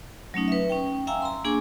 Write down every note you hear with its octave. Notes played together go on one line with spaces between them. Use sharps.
F#3 A3 C#4 D#4
B4 E5
C#4 G5
E5 F5 G5 G#5 A#5 E6
A#5 C6
A#3 D4 G#4 G#5 C#6 D6